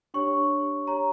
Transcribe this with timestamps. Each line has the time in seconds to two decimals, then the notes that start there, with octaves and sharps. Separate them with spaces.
0.14 D4 G4 C#5 C#6
0.87 G4 C#5 A#5